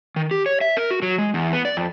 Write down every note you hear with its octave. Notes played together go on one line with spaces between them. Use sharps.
D#3
G4
C#5
E5
A#4
F#4
F#3
G#3
E2
B3
D5
F2